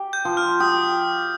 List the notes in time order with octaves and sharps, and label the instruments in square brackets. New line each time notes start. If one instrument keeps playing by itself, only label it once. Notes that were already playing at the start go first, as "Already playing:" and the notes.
Already playing: [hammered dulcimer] G4
[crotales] G6
[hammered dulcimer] F3
[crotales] F6
[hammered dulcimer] G4 [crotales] D#6